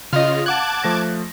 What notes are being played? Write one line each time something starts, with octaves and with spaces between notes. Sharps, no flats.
C#3 F4 D#5 F6
F5 F#5 A5 D6 F#6 G#6
F3 A3 A#6